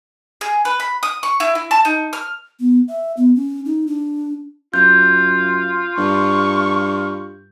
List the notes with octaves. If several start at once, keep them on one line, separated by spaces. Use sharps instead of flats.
G#4
B4
B5
D#6
C#6
E4
E4
A5
D#4
F6
B3
E5
B3
C#4
D#4
D4
F#2 F4 G6
G2 C#6